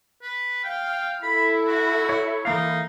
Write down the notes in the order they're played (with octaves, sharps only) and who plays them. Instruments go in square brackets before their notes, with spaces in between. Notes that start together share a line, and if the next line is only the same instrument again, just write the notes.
[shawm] B4
[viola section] F5 [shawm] G5
[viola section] E4 A4 [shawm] B5
[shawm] F#4
[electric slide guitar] C#5
[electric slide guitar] E3 A#3 F5 [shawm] D#4